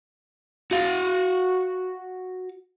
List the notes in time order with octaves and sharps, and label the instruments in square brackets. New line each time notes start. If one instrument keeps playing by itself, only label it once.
[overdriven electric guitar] F#4 F5